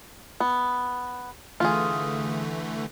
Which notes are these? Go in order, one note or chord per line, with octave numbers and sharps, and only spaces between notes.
B3
D3 E3 A3 F4 G#4